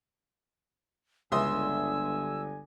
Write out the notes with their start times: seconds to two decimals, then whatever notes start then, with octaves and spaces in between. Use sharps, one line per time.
1.32 G1 C#2 D3 E5 G#5 C6 D#6 E6